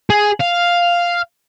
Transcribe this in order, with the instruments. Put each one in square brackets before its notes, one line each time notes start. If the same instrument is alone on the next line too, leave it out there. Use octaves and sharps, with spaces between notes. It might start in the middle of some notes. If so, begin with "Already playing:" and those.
[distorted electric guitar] G#4
F5